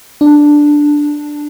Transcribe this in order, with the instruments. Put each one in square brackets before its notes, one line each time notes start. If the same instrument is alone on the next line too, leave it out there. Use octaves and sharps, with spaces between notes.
[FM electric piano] D4